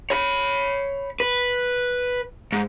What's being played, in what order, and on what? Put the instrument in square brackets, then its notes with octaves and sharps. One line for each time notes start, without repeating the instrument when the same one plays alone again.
[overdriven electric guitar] C#5 B5
B4
G#2